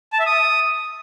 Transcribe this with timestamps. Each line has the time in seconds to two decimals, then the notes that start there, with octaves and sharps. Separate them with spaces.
0.13 A5
0.19 E5
0.26 D#6